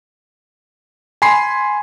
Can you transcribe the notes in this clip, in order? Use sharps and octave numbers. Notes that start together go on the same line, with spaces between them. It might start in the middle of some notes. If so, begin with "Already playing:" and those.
G#5 B5 C6 C7